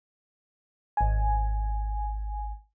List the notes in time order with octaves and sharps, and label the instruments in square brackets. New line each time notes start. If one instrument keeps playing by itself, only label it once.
[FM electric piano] G#1 G#5